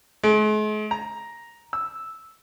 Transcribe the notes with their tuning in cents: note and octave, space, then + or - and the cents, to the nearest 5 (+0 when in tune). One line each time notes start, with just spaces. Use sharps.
G#3 +45
A#5 +5
E6 -5